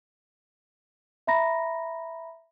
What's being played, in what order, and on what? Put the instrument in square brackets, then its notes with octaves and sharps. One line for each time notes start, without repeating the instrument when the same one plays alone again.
[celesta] E5 A#5 B5 A#6